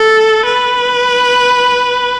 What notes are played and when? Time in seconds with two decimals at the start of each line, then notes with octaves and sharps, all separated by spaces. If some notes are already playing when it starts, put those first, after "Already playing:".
Already playing: A4
0.46 B4